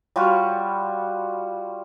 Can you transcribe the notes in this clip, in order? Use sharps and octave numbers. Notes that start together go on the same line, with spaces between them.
G3 F4 F#4 C#6